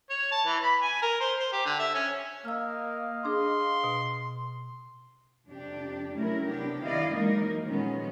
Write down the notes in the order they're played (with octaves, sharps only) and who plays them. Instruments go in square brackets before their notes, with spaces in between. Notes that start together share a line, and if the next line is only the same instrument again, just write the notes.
[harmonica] C#5
A5
E3
B5
G#5
A#4
C5
C5
G4
D3
E5
C#4
[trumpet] A#3 [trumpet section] D#5 F5 [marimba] E6 F6
[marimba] D4 G#4 [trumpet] C6
[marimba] B2
[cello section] F2 C3 D4 G4
C3 F#3 A3 C#4 E4 A#4
C3 B3 D4 G4
D#3 E4 D5 D#5 F5
E3 F#3 G#3 A#3 D#4 A#4
A#2 D#3 F3 G#3 B3 C#4